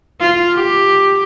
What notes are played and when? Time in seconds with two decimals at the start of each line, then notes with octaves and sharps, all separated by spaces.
0.21 F4
0.55 G4